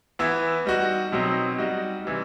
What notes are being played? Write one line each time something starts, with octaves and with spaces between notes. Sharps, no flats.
E3 B3 E4
G3 D#4 F#4
B2 F#3 C4 D#4
G3 D#4 F#4
C3 E3 G3